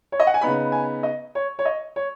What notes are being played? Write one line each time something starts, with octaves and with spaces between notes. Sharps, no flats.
C#5
D#5
F#5
G#5
C#3 B3 D#4 B5
G#5
D#5
C#5
C#5
D#5
C#5